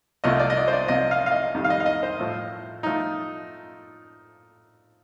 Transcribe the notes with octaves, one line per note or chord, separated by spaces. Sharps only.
C2 C3 F3 A3 D#5
D5
D#5
D5
C5
D5
C2 C3 F3 D#5
F5
F5
D#5
F2 D#3 G3
F5
D#5
F5
D#5
C5
A2 F3 A3
F3 A3 D#4